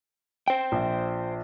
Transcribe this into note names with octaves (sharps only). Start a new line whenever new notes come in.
C5 G5
A#1